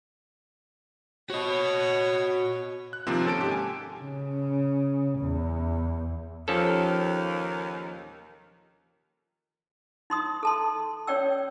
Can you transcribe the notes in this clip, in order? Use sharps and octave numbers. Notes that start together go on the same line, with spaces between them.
F#4 C#5 D#5
F#6
C3 D#3 F3 A#3 C4
C#4 A4 A5 D7
G#2 G4
G#5
C#3
E2
D#2 D#3 F3 C#4 A4
D#4 C6 D#6
A4 A5 C6
C#4 C#5 D5 G5 E6